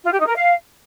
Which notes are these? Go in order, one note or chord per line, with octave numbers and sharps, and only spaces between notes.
F4
G4
D#4
A#4
F5